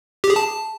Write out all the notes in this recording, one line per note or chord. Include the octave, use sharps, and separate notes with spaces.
G4
G#4
A5